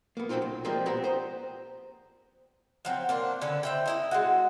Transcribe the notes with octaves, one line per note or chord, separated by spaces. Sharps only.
A#3 B3
C#3 F#3 A#3 C4 D#4 F4
B1
F3 G3 G#3 A#3 C4
A#2 B3 C4 G4 F#5 A#5
C5 D#5 A#5
F3 F#3 C4
A#3 D4 C5
D3 C#4 A4 B4
C4 E5 G5
D#4 E4 D#5
G#3 A#3 F#4